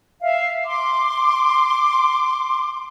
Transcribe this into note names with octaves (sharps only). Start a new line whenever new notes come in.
E5 F5
C6 D6